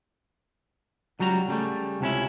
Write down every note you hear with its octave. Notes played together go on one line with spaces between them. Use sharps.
C#2 F#3 G3 F#4 A#5
C#3 G3 A3
C#2 C3 C#4 E4